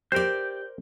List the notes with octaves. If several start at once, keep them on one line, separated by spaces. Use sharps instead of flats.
G4 A#4 C5 D5 G6